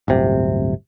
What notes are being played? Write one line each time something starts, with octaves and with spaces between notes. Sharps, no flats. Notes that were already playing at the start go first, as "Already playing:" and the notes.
D1 G1 C3